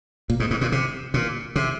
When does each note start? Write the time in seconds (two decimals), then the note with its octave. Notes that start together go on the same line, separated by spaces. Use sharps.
0.30 A#2
0.40 G#2
0.51 G#2
0.61 A#2
0.72 C3
1.14 A#2
1.56 C3